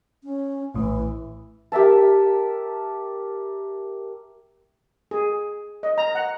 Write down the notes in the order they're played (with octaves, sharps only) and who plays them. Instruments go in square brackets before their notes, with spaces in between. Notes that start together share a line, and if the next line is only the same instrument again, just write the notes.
[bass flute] C#4
[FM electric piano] A#1 A2 [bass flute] E3
[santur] G4 A#4 E5 A5
[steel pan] G#4
D#5
A#5
F#5